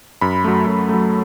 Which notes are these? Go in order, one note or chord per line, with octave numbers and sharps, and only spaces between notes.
F#2 B5
F#3 A3
F#2
F#3 A3